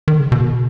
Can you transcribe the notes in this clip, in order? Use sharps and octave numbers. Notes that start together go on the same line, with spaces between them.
D#3
C#3
B2